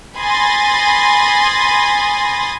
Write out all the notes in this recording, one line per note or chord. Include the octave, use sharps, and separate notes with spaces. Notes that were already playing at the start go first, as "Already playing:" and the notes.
G#5 B5 C6 D#6 A6 A#6